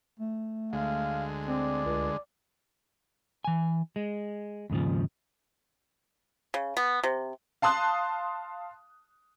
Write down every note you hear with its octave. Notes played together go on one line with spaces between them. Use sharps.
A3
D2 G#3 F5
C4 D5
C#2
E3 G#5
G#3
D#2 G#2 C#3 F3
C#3
B3
C3
F5 A5 C6 D#6 F#6